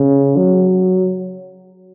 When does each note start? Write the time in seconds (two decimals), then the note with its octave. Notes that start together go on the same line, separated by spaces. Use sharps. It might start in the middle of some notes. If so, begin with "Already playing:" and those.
Already playing: C#3
0.37 F#3